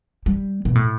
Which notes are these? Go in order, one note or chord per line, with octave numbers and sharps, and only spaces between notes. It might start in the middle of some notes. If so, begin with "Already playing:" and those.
G3
B2
A2